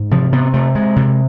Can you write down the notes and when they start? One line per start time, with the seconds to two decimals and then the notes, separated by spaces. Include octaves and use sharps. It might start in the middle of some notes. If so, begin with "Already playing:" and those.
Already playing: G#2
0.11 C3 F3
0.32 C3 B3
0.53 C3 A3
0.75 C3 G#3
0.96 C3